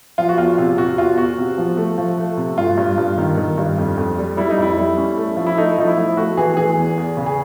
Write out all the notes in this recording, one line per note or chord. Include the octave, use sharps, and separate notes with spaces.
F3 F4
F#4
E2 F4
C3 F4
C3 F#4
E2 F4
E2 F#4
C3
F3
A3
F3
A3
C3
G2 F4
G2
G2
D#3
D#3
G2
F2
F2
G3
G3 E4
D#4
F2 E4
G3
C#4
A3
F3
E4
A3 D#4
F3 D#4
E4
F3
A3 F#4
E3 G#4
E3 G#4
E2
E2
C#3
G#4